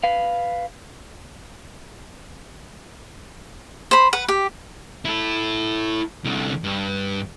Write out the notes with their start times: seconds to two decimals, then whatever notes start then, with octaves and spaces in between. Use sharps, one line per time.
0.04 B4 F5
3.91 C5 B5
4.13 B4 F#5
4.28 G4
5.05 E4 A4
6.24 C2 D3
6.64 G2